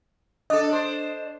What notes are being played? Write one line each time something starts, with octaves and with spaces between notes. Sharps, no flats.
D4 A4 D#5
D4 C5